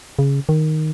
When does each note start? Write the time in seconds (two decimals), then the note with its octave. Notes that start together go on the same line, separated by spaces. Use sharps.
0.19 C#3
0.49 D#3